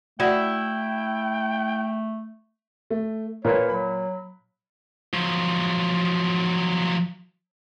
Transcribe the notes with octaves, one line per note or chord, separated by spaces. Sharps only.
A3 E4 F#4 D5 F#5 G5
A3
A#2 A#4 B4 C#5
F#3 B5
F3 F#3